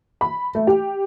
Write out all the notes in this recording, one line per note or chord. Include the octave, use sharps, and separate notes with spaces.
B5
A3
G4